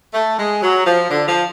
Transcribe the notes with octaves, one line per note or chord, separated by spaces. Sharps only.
A3
G#3
F#3
F3
D3
F3